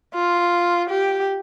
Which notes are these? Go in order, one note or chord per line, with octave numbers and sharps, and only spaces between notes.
F4
G4